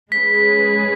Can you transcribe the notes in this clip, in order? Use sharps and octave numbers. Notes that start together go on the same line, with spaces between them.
G#3 C#4 G#4 B4 B6